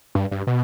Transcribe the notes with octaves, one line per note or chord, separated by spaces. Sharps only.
G2
G2
B2